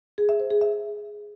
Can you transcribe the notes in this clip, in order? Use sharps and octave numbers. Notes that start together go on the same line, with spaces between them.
G#4
E5
C5
G#4
E5